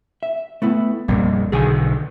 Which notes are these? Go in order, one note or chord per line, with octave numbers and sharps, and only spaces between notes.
E5
A3 B3 E4
A#1 F2 G3 A#3
B1 D3 D#3 G#4 G#5